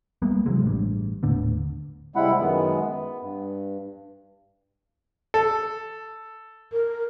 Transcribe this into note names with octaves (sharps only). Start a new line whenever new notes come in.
G3 G#3 A#3 B3
C3 E3 F#3 G#3
A1 G2
D#1 A2 D3 B3
C3 G3 G#3 E4 F#5 B5
F#2 D#3 G#3 B3
B3
G2
A4
A#4